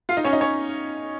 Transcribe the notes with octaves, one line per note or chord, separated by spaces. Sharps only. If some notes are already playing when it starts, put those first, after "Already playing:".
F4 F5
D#4 D#5
C#4 C#5
D#4 D#5
C#4 C#5